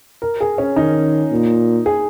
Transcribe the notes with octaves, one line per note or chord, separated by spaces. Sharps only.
A#4
G#4
C#4
D#3 D#4
A#2
G#4